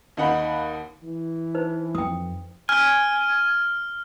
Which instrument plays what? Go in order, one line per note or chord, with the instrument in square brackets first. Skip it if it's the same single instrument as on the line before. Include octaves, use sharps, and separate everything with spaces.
[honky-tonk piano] D#2 D#4 F#5 B5
[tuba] E3
[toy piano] D#4 B4 C5
[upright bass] F2 [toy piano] G5 D#6
[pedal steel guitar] G#5 [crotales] F6